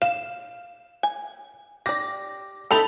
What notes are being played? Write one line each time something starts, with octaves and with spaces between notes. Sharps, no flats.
F5 E7
G#5
G4 D5 A#6
C4 D#4 E4 A4 B5 F7